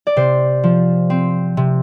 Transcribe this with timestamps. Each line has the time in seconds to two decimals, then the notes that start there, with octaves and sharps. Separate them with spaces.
0.07 D5
0.16 C3 C5
0.63 F3
1.10 C4
1.57 C3